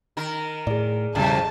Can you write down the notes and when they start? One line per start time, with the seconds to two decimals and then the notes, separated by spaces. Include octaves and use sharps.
0.17 D#3 A#4
0.67 A2 G#4 D5
1.15 E1 F2 A2 C#3 G3 A5